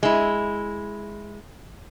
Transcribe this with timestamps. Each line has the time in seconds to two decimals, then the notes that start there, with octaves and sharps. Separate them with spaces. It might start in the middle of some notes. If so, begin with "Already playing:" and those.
0.03 G#3 E4